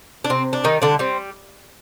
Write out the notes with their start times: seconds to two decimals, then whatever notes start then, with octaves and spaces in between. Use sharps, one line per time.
0.24 D4
0.30 C3 C4
0.53 D4
0.64 D#3 G3 D#4
0.82 D3 D4
0.99 G3 C4